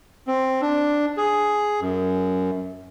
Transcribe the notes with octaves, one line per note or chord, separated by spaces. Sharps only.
C4
D4
G#4
F#2